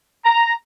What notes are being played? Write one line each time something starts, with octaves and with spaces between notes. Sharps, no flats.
A#5